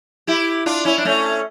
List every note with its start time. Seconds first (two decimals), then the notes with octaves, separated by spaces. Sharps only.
0.27 E4 G4
0.66 D4 F4
0.85 C#4 E4
0.98 D4
1.05 A3 C#4